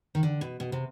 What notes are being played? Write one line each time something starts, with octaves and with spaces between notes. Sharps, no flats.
D#3
D3
B2
B2
C3